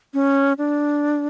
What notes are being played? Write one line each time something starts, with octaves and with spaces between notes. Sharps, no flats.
C#4
D4